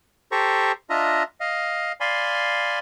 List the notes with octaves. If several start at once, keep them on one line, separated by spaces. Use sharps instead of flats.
G4 A4 C5 A#5 C#6
D4 F4 D#5 E5 A#5
D#5 F5
D5 F5 G#5 B5 C6